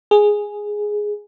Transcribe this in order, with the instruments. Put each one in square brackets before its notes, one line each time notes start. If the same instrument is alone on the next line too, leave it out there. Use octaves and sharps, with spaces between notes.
[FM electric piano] G#4